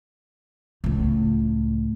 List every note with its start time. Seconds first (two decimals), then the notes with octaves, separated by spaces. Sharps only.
0.84 C#2 A2